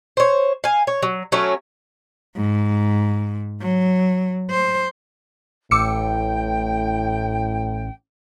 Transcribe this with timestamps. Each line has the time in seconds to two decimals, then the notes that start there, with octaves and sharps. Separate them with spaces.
0.17 C5 C#5
0.64 F5 G#5
0.87 C#5
1.02 F#3
1.32 F#3 A3 C#4 C#5
2.36 G#2
3.61 F#3
4.50 C5
5.71 A1 A2 G5 D6 E6 C#7